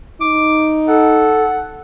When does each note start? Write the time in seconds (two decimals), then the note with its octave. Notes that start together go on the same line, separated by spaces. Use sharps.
0.21 D#4 D6
0.88 A4 F#5